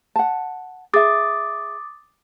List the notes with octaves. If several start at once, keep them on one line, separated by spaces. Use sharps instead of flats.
F#5 A5
G#4 E5 D6 D#6 A6